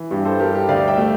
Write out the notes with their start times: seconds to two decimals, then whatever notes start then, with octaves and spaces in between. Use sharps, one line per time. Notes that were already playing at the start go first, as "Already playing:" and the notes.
Already playing: E3
0.11 G2 G4
0.25 A4 C5
0.39 G3 G4 A#4
0.54 G4
0.68 D2 D5 F5
0.88 E5 G5
0.97 A3